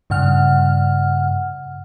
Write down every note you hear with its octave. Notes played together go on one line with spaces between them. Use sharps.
G2 C#3 F#5 F6